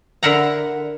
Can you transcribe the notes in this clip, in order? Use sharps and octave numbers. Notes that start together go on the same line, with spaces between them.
D3 E4 A#4 F#5 A#5